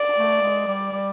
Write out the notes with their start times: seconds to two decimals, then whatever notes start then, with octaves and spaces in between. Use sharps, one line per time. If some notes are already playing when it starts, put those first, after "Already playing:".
Already playing: D5
0.17 A3
0.42 G#3
0.67 G3
0.93 G3